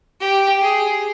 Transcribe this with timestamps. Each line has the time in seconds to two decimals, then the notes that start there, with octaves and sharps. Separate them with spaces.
0.21 G4
0.61 G#4